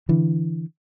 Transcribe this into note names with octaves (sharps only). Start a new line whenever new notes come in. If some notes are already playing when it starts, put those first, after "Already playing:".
D3 E3